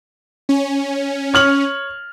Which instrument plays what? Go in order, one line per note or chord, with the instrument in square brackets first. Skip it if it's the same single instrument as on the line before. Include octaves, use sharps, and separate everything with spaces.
[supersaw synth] C#4
[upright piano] C#5 F6 F#7